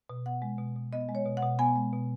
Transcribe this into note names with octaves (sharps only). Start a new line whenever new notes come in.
B2
B3 F#5
G#3
B2
B2
B3 D#5
G#3
C#5
B2
F#5
B2
B3 G#5
G#3
B2